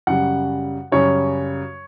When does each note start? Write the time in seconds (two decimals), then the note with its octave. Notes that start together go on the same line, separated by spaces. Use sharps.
0.07 F#2 C#3 G3 F#5
0.92 F#2 C#3 G3 C#5